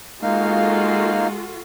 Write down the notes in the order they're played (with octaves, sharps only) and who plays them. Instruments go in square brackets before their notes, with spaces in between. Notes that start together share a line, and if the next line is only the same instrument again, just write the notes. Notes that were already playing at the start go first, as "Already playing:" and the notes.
[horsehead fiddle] G#3 [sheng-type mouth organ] A#3 D#4 F5 [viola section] F4 F#4 A4